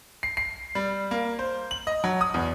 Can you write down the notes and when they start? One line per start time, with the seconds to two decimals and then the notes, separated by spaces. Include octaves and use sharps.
0.23 C7
0.37 C7
0.75 G3
1.11 A#3
1.39 C5
1.71 F#7
1.87 D#5
2.04 F#3
2.21 D#6
2.34 E2